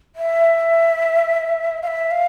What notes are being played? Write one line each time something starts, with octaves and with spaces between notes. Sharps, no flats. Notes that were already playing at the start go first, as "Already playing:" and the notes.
E5
F5
E5
F5